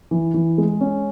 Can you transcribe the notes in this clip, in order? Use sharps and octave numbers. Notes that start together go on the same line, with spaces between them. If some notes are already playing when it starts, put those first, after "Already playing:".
E3
E3
G#3
C#4